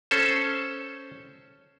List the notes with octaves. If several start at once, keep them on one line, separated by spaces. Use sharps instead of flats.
C#4 A4 C5